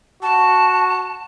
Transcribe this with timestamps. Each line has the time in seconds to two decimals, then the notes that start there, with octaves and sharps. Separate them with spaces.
0.22 F#4 A5